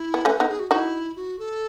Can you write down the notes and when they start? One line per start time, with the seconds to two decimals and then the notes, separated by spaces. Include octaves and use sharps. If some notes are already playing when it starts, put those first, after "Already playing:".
Already playing: E4
0.14 B3
0.25 A3 C#4 B4
0.37 B3 D#4 A4
0.49 G#4
0.59 F#4
0.71 D#4 E4 F#4
1.16 F#4
1.39 A4